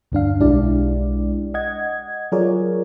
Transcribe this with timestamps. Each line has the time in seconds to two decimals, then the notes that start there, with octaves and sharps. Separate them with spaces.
0.12 D2 G2 D4 F5
0.40 B1 G#3 D4 E4 G4 D5
1.54 D#5 F#5 G#6
2.32 F#3 F4 G#4 A#4 C#5 D5